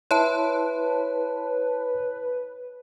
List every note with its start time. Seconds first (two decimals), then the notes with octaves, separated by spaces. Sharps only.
0.11 E4 B4 C#5 E5 A5 C6